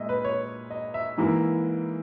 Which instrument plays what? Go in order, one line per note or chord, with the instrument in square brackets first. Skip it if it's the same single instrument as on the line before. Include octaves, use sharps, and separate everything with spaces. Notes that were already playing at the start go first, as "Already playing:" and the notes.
Already playing: [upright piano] A#2 G#3 D#5 E5
B4
C#5
D#5
E5
G#2 E3 A#3 E4